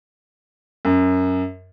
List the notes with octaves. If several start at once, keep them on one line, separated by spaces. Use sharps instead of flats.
F#2